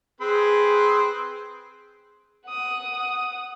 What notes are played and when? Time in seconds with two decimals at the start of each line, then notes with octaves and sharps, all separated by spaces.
0.21 C4 G#4 B4 C6
2.46 F#5 D#6